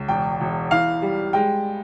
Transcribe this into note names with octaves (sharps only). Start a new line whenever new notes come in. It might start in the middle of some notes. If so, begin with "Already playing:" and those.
Already playing: C#2
E1 G5
E1
E3 F5
G3
G#3 G5